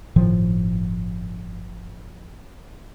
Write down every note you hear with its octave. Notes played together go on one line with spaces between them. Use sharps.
G1 A2 D#3 F3